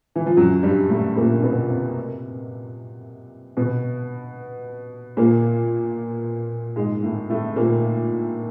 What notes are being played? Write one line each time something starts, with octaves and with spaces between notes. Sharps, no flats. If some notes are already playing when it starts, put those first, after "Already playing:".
E3
F3
F#2 F#3
G2 G3
A2 A3
A#2 A#3
B2 B3
C3 C4
B2 B3
A#2 A#3
G#2 G#3
A2 A3
A2 A3
A#2 A#3